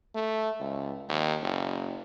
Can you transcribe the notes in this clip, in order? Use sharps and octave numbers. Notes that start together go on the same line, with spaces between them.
A3
C#2
D#2
F#1